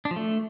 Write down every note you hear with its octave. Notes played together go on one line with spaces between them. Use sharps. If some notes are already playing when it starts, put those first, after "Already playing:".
D4
F3
A3